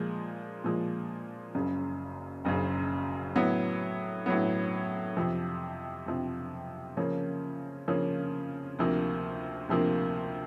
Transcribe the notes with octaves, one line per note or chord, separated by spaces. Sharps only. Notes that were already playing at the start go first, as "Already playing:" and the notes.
Already playing: A#2 F3 G#3
A#2 F3 G#3
F#1 F#2 C#3
F#1 F#2 C#3
A2 F#3 B3
A2 F#3 B3
F2 C3 F3
F2 C3 F3
C#3 F3 A#3 C#4
C#3 F3 A#3 C#4
D2 C3 F3 A#3
D2 C3 F3 A#3